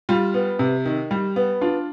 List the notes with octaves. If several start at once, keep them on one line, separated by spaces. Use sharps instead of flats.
G3 F4
B3
C3
D#3
G3
B3
D4 F4